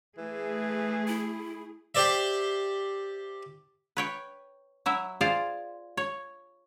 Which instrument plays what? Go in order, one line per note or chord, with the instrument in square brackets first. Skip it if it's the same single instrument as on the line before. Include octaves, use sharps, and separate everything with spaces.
[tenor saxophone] E3 [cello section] A3 G#4
[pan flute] E4
[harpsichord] G4 C5 D5 E5
[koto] B4 C#5 G5
F#3 E4 E5
F4 G#4 C5 D5 F5
C#5